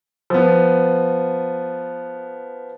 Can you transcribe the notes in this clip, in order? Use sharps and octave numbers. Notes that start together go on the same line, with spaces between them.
F3 B3